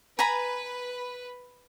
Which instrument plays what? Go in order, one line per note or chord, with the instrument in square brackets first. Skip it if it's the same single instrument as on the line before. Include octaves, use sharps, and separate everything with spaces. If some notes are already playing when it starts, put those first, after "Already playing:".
[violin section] B4 [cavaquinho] G#5 A#5 B5